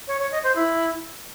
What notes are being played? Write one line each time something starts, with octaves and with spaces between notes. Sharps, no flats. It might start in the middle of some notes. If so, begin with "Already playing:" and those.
C#5
C#5
D#5
C5
E4